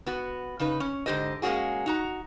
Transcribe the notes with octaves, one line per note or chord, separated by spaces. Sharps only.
B3 F#4
C#3 D#4 B4
C#4
G#2 D3 G4 C5 D#5
G#3 A#3 C4 C#4 F#4 G#4
D#4 F#4 A#5